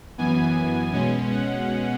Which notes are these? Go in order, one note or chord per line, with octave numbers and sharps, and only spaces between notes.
F#2 E3 B3 G#5
B2 G#3 C#4
F#5